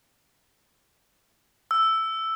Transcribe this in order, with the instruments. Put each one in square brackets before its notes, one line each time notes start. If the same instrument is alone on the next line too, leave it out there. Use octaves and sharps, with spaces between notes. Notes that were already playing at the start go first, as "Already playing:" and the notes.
[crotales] E6